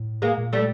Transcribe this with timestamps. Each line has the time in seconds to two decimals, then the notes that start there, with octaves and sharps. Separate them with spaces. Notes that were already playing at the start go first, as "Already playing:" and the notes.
Already playing: A2
0.22 G#3 A#3
0.38 A#2
0.53 G3 A3